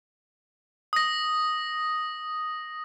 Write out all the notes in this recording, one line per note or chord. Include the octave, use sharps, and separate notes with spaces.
D#6 A#6